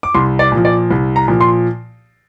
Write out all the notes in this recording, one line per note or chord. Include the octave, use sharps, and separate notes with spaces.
D6
C2 C6
D5
A#2
F3
D5
C2
A#5
A#2 F3
C6